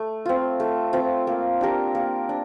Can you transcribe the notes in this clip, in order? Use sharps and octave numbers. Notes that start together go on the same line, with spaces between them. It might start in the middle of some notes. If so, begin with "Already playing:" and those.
Already playing: A3
C4 F4
A3
C4 F4
A#3
D4 G4 A#4
A#3
D4